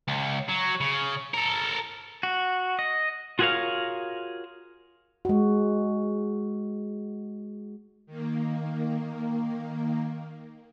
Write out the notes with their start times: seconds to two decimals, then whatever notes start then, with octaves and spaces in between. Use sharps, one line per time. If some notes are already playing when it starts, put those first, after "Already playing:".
0.08 C#2
0.49 F#3
0.81 C#3
1.34 A4 A#4
2.23 F#4
2.79 D#5
3.39 F4 F#4 G#4 A#4 C#5 F5
5.25 G#3 F#4
8.06 D#3 A#3